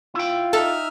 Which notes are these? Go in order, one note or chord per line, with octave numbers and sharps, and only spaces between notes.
E4 F4 G5
D#4 A4 E5 F6